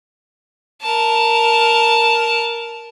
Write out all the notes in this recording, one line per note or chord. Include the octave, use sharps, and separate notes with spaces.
A#4 A5